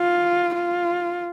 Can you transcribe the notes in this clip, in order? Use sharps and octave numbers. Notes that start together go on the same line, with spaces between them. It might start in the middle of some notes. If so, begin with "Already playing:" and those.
Already playing: F4
F4